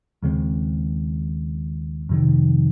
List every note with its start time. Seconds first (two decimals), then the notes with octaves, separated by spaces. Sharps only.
0.22 D#2 C#3 G#3 C4
2.09 F2 C3 D#3